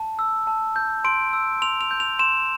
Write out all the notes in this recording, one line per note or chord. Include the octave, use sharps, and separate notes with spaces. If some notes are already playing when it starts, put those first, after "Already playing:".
Already playing: A5
E6
A5
G6
C6 D7
E6
C6 F7
F7
G6
F7
C6 E7